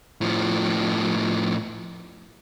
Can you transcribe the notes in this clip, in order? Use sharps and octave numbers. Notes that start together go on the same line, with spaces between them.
A2 F3